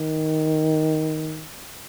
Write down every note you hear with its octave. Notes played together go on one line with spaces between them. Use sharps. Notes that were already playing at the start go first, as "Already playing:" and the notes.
Already playing: D#3